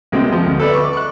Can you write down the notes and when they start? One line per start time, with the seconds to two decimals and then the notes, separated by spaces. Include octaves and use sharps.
0.12 C2 F#2 B2 G#3 C4
0.32 F3
0.44 D2
0.60 A4 B4 D5
0.73 C#6 D6
0.93 C#6 F#6